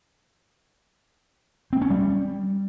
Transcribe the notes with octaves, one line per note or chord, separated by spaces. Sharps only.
C4
C#4
G3